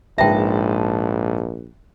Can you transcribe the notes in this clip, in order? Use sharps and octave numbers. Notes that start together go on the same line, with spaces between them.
A#1 G#2 B4 E5 G5 A5